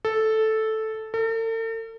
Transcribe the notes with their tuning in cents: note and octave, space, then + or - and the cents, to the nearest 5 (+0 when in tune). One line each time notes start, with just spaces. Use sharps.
A4 -5
A4 +45